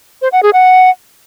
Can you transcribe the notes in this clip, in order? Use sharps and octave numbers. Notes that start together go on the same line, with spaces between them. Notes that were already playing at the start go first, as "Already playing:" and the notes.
C5
F#5
G#4
F#5